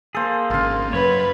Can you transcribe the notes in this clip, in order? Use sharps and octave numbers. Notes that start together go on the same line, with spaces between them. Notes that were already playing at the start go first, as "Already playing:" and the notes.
A#3 G#4 A4 C5
G#1 C#3 F4 F5
F#2 B4 C#5